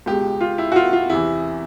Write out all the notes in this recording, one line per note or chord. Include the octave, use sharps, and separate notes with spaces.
C#2 B2 G#3 G4
F4
E4
F#4
F4
F4
E2 C3 E3 E4